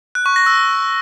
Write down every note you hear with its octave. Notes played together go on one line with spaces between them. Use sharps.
F#6
C#6
A#6
E6